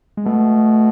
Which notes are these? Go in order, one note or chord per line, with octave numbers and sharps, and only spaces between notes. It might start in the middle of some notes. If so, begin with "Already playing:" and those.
G#3
B2 A3